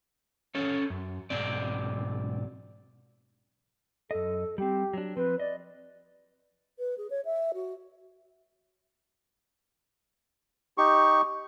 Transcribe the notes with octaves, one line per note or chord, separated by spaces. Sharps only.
C#4 A4 C#5
F#2
B1 G#2 C4 D5
F#2 A4 D#5
G3 C4 G4
F#3 D4
F3 C4 B4
D5 D#5
B4
G#4
C#5
E5
F#4
D#4 G4 C#6